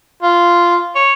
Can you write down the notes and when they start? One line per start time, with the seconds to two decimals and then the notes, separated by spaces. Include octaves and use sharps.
0.22 F4
0.95 C#5